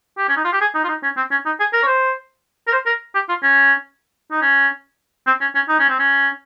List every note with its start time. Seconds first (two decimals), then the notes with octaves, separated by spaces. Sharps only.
0.18 G4
0.28 C#4
0.37 D#4
0.45 F4
0.53 G4
0.61 G#4
0.75 D#4
0.84 F4
0.89 D#4
1.03 C#4
1.17 C4
1.31 C#4
1.46 D#4
1.60 G#4
1.73 A#4
1.83 C#5
1.87 C5
2.68 A#4
2.73 C5
2.86 A#4
3.15 G4
3.29 F4
3.43 C#4
4.31 D#4
4.42 C#4
5.27 C4
5.41 C#4
5.55 C#4
5.69 D#4
5.79 C#4
5.89 C4
5.99 C#4